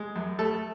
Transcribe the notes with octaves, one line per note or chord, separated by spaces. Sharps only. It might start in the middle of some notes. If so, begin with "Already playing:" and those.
Already playing: G#3
F#2
A3 A4